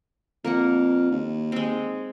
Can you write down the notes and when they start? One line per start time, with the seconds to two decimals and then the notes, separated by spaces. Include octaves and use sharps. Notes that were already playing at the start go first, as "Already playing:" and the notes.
0.44 F2 A#3 A#4 F#5
1.11 D#2
1.52 G#3 C4